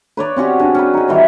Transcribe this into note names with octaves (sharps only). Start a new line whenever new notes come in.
B4 C#5 D5
C4 C#4 F#4 G4
D4 G#4
C#4 B4
D#4 G#4
E3 G3 C5 C#5